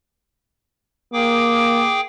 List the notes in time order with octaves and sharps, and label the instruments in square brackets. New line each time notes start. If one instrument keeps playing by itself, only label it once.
[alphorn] A#3 [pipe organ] G#4 G5 D6